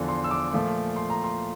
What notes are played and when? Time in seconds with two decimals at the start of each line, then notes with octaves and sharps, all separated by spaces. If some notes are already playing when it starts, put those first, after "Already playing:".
Already playing: E2 D3 F3
0.09 C6
0.24 E6
0.31 D6
0.53 A#2 F3 A3
0.96 C6
1.10 A#5
1.24 C6